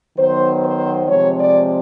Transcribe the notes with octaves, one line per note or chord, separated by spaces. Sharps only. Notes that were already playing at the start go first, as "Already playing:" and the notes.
D#3 F#3 B3 C5
C5
C3 F3 G#3 C4 C#5
D5